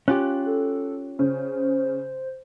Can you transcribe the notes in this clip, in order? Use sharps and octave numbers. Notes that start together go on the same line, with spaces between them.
C#4 F4 G4 F#6
A4
C#3 C5